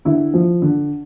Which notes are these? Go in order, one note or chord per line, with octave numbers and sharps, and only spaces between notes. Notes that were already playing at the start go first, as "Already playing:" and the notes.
D3 E4
F3
D3